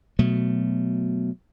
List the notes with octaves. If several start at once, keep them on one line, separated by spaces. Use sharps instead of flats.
B2 F#3 A3